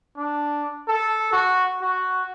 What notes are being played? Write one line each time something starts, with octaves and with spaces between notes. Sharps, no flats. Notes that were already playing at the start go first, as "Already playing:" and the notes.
D4
A4
F#4
F#4